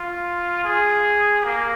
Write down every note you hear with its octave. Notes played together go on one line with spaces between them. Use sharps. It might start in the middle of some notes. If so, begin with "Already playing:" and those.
Already playing: F4
G#4
A#3